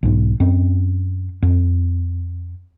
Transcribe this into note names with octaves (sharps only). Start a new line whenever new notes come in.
B1 G#2
F#2 C4
F2